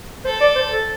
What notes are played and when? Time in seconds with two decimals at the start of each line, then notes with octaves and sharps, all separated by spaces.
0.25 A4 C5
0.41 D5
0.56 C5
0.72 A4